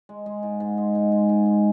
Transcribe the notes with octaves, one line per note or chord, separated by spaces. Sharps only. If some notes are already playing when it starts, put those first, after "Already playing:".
G#3
G#3
G#2
G#2
G#3
G#2
G#3
G#2
G#3